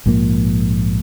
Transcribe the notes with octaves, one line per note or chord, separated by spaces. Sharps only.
A#1 G#2 F3 A#3